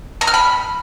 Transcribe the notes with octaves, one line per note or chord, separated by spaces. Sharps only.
A#5
F6
B5